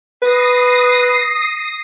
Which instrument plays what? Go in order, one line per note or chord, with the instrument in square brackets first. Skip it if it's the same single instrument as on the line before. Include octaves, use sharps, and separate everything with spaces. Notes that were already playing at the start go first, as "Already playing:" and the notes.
[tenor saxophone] B4 [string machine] D#6 A#6 C7